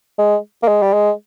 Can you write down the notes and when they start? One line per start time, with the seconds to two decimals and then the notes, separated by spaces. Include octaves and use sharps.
0.19 G#3
0.63 A#3
0.68 G#3
0.82 G3
0.93 G#3